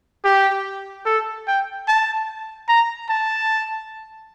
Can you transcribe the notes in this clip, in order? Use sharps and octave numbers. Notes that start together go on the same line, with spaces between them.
G4
A4
G5
A5
A#5
A5